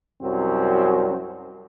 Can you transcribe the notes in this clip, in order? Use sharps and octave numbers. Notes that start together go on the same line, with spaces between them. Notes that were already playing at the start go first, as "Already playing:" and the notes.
C2 F#2 F#3 C4 F#4